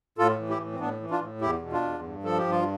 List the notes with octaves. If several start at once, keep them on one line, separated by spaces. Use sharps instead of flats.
A2 F4 A4
E3
E4 G4
A2
C4
A2 B3 D4
E3
D4 F4
A2
E2 E4 G4
B2
D4 F4
E2
G2
F3 A4
G4
G2
F4